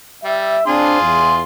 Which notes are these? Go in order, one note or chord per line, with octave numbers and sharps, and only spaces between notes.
G3 E5
C4 D4 F4 G#4 C6
E2